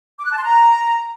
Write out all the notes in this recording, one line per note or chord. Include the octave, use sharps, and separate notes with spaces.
D6
F#6
A5
C6
A#5